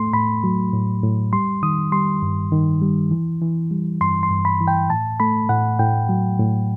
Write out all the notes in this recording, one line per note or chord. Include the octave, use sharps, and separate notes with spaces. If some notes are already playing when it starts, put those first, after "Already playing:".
Already playing: A2 A3 C6
A2 B5
F#3
A2
A2
G3 C6
D#3 D#6
G3 C6
G2
D#3
G3
E3
E3
G3
G2 C6
C6
G2
B5
E3
G5
A2 A5
A3 B5
A2 F#5
A2 G5
F#3
A2